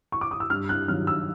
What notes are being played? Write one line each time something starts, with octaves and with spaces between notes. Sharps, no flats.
C#6
D6
D#6
E6
G2 F6
F#6
D#3 F#3 F6
E6